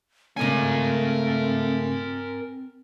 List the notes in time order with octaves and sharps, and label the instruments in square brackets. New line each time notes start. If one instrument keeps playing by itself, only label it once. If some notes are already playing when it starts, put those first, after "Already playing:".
[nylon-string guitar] C#3 G#3 C#4 [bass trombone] A3 [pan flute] C4 [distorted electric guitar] A#4 G#5